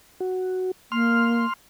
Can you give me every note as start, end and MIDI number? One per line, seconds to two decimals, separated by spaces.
0.20 0.71 66
0.92 1.45 58
0.92 1.53 84
0.92 1.53 89